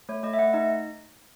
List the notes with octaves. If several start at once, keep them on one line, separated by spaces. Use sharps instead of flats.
A3 C#5
A3 D#5
E5
A3 F#5
D#4 D#5